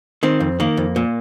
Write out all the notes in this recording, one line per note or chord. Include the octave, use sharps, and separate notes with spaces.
D#3 C4
F2
D#3 A#3
F2
A#2